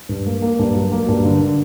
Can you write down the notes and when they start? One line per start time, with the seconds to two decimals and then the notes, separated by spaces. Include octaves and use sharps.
0.09 G2
0.26 A#3
0.42 A#3
0.59 G2
0.75 F#3
0.92 A#3
1.08 G2
1.25 D3
1.42 D3